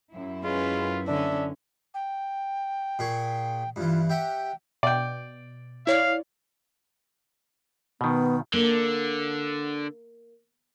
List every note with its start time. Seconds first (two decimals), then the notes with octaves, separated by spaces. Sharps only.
0.12 F#2 E4
0.44 G#3 C#4 F4 B4
1.07 D3 C#4 D4 E5
1.94 G5
2.99 A#2 G#4 C#6
3.76 G2 E3 F4
4.09 G4 E5 F#5 G5
4.83 B2 D5 G5
5.87 E4 C#5 D5 F5
8.01 B2 D#3 B3
8.53 D3 A#3